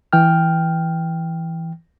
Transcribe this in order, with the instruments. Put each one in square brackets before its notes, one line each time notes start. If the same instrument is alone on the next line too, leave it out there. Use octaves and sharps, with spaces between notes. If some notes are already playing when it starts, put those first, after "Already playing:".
[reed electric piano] E3 G5 F6